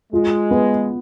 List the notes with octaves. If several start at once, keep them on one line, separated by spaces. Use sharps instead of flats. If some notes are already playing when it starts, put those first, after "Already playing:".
G#3 F4
B3